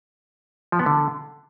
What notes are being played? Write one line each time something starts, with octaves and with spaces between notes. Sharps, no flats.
F3
B3
D3